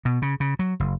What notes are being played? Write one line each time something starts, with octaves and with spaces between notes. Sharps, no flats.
B2
C#3
C#3
F#3
F#1